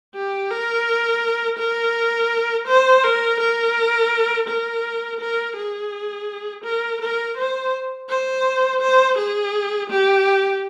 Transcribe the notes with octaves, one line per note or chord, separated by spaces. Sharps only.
G4
A#4
A#4
C5
A#4
A#4
A#4
A#4
G#4
A#4
A#4
C5
C5
C5
G#4
G4